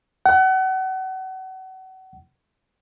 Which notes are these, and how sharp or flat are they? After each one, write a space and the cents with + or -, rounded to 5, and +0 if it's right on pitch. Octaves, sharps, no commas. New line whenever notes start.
F#5 +35